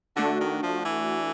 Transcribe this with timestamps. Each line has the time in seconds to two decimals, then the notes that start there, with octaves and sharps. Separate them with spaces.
0.16 D3 A3 D4 F#4
0.40 D#3
0.63 F3
0.85 E3